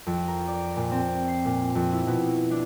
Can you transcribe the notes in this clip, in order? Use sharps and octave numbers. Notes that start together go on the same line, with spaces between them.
F2
A#4
D5
A#2
C4
C7
A#2
F2
E4
B2
D4